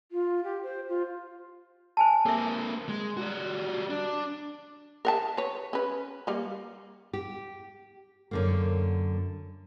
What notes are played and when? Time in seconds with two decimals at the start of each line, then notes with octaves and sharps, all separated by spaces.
0.12 F4
0.44 G4
0.63 C5
0.88 F4
1.97 C5 G#5 A5
2.26 A#3 C4 A4 E5
2.89 G#3
3.17 G3 F#4
3.90 D4
5.05 A#4 F#5 A5
5.37 B4 C#5
5.73 C#4 B4
6.27 G3 A#3
7.13 G4
8.31 F#2 D3 A#3